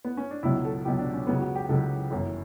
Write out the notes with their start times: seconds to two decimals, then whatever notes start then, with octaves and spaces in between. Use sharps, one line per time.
0.05 B3
0.17 C#4
0.31 D4
0.43 C#2 B2 F#3 E4
0.65 A4
0.85 C#2 B2 F#3 G4
0.99 D4
1.14 C#4
1.27 C#2 C#3 F#3 B3
1.41 F#4
1.55 G4
1.69 C#2 C#3 F#3 A4
2.11 G1 F#2 E3